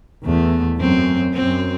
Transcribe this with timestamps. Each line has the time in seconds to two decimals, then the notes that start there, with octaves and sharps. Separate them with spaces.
0.25 E2 A3
0.80 F#2 C4
1.34 F#2 C4